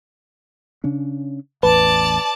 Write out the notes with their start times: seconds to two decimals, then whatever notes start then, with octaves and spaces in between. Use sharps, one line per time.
0.84 C#3 C#4 D4
1.63 A1 E2 B4 D5 A5